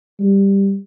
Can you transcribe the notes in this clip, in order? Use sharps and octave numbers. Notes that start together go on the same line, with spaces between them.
G3